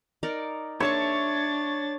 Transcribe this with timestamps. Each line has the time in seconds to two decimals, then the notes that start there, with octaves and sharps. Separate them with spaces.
0.23 D#4 A#4 D5
0.80 D4 C#5 E5 A5 C#6 A6